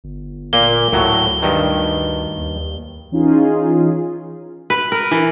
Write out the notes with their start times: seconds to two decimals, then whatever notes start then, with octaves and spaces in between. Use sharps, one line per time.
0.04 G1
0.53 A#2 A#3 G7
0.93 D2 A2 F#3
1.42 G2 D#3
2.37 D#2
3.11 E3 C#4 D#4 F4 G#4
4.70 B4
4.92 A#4
5.11 E3